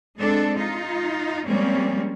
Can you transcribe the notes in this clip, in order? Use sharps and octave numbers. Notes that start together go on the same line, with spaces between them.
G#3 C4 D4 A4
D#4 F4
F3 G3 G#3 A#3 C4 C#4